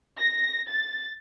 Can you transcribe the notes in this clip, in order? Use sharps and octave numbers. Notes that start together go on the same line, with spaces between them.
A#6
A6